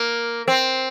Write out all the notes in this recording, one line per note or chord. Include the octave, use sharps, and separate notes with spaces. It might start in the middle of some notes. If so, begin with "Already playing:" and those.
Already playing: A#3
C4